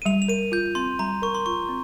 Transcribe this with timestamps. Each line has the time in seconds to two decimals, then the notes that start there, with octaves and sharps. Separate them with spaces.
0.02 D#7
0.05 G3 F7
0.22 F7
0.28 A#4 D#7
0.52 F4 G6
0.75 C4 C6
0.99 G3 A#5
1.22 A#4 C#6
1.35 C6
1.46 F4 C#6
1.69 C4